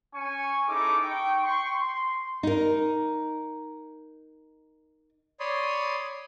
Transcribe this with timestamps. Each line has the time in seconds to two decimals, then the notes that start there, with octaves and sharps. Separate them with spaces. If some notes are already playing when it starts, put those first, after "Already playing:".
0.14 C#4 G#5 C#6
0.68 C#4 D#4 E4 G#4 A4 D6
1.04 D#4 G5 C#6
1.42 G5 C6 C#6
1.74 C6
2.43 D#4 A#4
5.40 C#5 D5 B5 C6 D#6